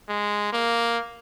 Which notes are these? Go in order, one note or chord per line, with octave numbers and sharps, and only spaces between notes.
G#3
A#3